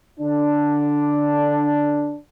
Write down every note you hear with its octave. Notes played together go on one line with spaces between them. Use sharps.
D3 D4